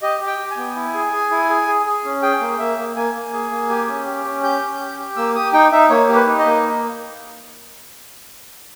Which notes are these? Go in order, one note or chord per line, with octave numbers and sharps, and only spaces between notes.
G4 D#5
G4
G5
G4
G#5
B3
E4
G#4
G#4
E4
G#4
G#4
G#4
C#4
G#4 G5
A#3
A#3 E5
A#3
A#3 G#5
A#3
G#4
A#3
G4
C#4
G4
C#4
G4 G6
C#4
G4
G4
A#3 E6
G4 D#6
D#4 G5
D#4 E5
A#3 C#5
G4
B4
D#4
D#5
A#3